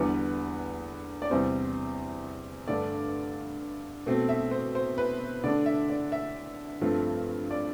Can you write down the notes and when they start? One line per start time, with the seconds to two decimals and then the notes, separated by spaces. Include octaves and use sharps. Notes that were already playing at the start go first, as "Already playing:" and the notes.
Already playing: E2 D3 G3 B3 B4
1.22 D5
1.30 E2 C3 G3 C4 C5
2.68 G2 D3 A3 D5
4.06 B2 A3 C4
4.29 E5
4.51 C5
4.75 C5
4.98 B4
5.44 D3 A3 D4 D5
5.66 E5
5.90 D5
6.12 E5
6.81 G2 F3 A3 C4
7.51 D5